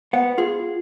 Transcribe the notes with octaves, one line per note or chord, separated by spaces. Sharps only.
B3 F#5
F4 G#4